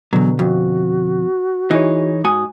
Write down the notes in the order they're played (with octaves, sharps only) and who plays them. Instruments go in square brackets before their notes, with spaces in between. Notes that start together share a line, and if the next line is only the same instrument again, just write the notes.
[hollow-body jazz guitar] E2 F#3 [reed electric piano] B2 D3
[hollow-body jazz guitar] F2 [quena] F#4
[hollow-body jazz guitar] E3 D#4 [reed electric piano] E4 G#4 C#5
[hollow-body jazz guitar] G#2 F#4 G#5 [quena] D#6